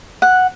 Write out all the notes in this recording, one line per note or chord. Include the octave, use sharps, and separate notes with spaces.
F#5